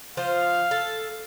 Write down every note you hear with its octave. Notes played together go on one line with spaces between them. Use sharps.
F3 F4 C5 F5
A4